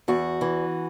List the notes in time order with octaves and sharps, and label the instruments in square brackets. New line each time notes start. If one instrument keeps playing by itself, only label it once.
[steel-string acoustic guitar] E2 F#4
E3